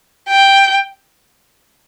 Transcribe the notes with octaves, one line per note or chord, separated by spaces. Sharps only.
G5